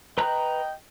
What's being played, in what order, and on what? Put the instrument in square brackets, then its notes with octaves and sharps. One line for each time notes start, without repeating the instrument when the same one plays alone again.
[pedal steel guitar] B4 A#5 F#6 [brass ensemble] D#5 G5